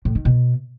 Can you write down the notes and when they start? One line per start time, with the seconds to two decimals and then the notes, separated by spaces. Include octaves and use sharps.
0.05 A2
0.15 D#3
0.25 B2